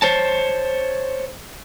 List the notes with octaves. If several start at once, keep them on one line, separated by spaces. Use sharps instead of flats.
C5 C#5 A5